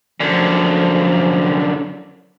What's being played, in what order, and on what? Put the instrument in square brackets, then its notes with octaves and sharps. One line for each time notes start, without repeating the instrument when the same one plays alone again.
[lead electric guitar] F#2 D3 [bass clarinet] F3